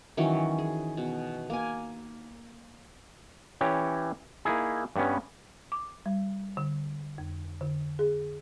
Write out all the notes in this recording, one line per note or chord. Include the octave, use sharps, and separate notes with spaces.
D#3 E3 F#3 C#4
G#4
B2
A#3 G#5
E3 C#4 G4 C#5
A#3 D#4 E4 G#4
G2 G3 B3 C#4
D6
G3
D3
F2
D3
G#4